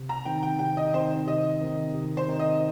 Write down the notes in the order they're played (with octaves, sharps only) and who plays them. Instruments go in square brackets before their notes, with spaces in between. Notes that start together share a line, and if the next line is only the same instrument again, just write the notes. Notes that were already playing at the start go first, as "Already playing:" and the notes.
Already playing: [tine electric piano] C3
[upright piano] A#5
[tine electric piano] D#3 C4 D#4 [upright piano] G5
[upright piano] G5
[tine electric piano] C3 [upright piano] G5
[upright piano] D#5
[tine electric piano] D#3 C4 D#4 [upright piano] C5
[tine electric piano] C3 [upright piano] D#5
[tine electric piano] D#3 C4 D#4
C3
[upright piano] C5
[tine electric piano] D#3 C4 D#4
[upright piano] D#5